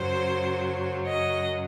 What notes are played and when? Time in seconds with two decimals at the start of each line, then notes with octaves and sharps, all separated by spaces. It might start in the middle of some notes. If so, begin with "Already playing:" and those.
Already playing: F#2 C#3 F#3 C5
1.05 D#5